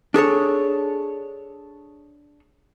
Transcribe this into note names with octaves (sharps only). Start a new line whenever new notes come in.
D4 G#4 A4 C#5